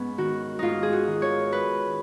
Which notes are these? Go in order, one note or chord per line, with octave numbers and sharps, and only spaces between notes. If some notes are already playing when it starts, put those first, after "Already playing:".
Already playing: G#2 B3 C#4
D#3 F#4
G#2 D#4 F4
G#4
F#4
D#3
C#5
B4